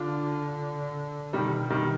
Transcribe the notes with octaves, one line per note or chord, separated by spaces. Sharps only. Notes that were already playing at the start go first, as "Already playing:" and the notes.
Already playing: D3 D4 F4
B2 D#3 G3
D#3 G3